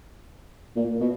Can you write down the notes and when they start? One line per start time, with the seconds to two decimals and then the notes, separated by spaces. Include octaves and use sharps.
0.76 A#2
1.00 B2